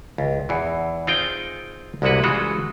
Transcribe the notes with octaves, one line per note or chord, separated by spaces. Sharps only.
C#2
E2 E3
C4 D#4 F4 G#4 G5
C2 C3 G#3 A#3 F#4 B4
C#3 E3 G#3 F4 F#4 A4